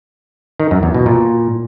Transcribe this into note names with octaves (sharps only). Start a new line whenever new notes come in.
D#3
F#2
E2
B2
A#2